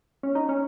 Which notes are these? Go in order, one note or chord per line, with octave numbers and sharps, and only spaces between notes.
C#4
D#4
C#4